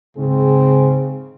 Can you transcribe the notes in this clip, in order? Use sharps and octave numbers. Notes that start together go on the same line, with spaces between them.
G#2 C#3 C4 G#4